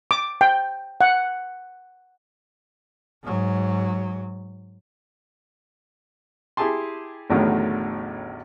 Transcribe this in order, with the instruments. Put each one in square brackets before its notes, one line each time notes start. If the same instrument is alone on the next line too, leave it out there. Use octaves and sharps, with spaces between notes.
[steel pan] D6
G5
F#5
[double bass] G#2 F#3
[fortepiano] E4 G4 G#4 G#5 A5 C6
A1 E2 A2 D3 D#3 F#3